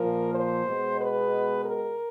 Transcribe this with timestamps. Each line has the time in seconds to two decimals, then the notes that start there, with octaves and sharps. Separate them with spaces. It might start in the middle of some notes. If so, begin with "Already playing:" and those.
Already playing: A#2 F3 A#3 A#4
0.32 C5
0.65 B2 G#3 B3
0.98 B4
1.63 A#4